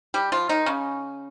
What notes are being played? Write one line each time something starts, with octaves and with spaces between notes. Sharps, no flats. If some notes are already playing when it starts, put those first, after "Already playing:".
G3 G4
F3 F4
D#3 D#4
C#3 C#4